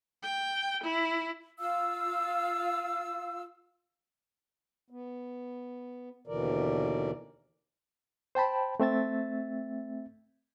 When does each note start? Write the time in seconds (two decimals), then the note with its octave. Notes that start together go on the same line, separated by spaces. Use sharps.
0.23 G5
0.84 E4
1.59 F4 F5 E6
4.90 B3
6.27 D#2 B2 D3 E3 A#4 D5
8.35 C5 G5 A5 B5
8.80 A3 C4 E5 A6